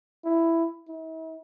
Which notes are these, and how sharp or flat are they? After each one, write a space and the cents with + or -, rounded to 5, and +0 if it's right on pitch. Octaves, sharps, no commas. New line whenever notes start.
E4 +10
E4 -45